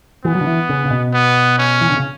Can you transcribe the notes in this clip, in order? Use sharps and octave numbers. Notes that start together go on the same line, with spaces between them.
E3 B3
F#3
D3
E3
C#3
C#3
B2
B3
C#4
E3
D3
C#3